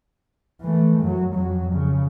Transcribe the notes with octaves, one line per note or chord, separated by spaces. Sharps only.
E3 A3
F#2 F#3
F2 F#3
C#3